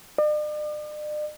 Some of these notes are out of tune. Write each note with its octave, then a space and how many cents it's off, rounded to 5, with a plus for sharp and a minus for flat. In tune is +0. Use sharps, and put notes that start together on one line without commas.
D5 +45